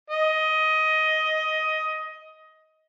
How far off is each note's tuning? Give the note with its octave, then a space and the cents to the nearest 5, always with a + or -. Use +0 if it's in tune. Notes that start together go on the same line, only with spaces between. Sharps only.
D#5 +15